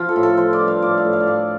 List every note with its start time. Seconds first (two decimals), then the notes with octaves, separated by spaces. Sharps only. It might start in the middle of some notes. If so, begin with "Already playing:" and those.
Already playing: F3 F4
0.09 A4
0.16 A2
0.23 A4
0.37 F3 C5
0.53 D5
0.60 G2
0.68 F5
0.82 A2 D5
0.98 F5
1.05 A2
1.13 F5
1.20 D5
1.27 A2 F5